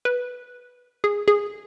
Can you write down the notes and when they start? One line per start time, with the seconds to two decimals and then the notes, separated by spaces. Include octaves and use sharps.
0.05 B4
1.04 G#4
1.28 G#4